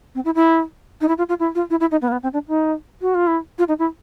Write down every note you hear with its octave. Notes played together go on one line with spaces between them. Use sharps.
C4
E4
E4
D#4
E4
F4
F4
E4
F4
E4
E4
D#4
B3
A#3
B3
C4
D4
D#4
F#4
F4
E4
F4
D#4
E4